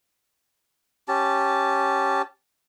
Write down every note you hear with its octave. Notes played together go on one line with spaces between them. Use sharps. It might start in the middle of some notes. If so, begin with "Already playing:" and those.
C#4 G4 A5